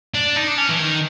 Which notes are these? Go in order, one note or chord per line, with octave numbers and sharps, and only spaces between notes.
D4
D#4
D4
C#4
E3
D#3